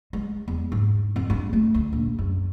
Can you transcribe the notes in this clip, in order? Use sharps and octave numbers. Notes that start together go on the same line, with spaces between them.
G#3
E2
G#2
F2
G2
A3
D2
A#1
F#2